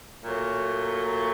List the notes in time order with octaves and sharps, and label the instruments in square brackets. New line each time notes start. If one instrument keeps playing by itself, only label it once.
[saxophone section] A#2 F#3 A3